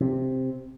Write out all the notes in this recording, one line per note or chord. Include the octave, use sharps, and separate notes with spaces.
C3